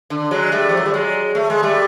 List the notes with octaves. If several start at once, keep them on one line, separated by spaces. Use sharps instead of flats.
D3
F#3 G#3
G3 A3
F3
F#3
G3
F#3 G#3
A3
G#3
G3 A3